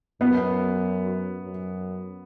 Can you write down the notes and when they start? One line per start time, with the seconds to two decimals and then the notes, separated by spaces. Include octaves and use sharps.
0.21 F#2 B3
1.42 F#2